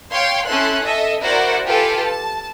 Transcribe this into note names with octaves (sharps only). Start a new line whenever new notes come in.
C#5 F5 G5 C6
C#4 E4 A4 C6 F#6
A4 D#5 E5
E4 F#4 A#4 C5 D5 F#5
F4 G4 A4 B4 G#5
A5